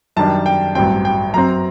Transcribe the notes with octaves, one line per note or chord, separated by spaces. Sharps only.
F#2 D#3 G3 D4 A5
G5
A1 G2 F#3 C4 G5
G5
F#2 F#3 C4 A#5